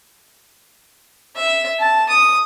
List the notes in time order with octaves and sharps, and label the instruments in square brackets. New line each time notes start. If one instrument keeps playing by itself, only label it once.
[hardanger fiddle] E5
A5
D#6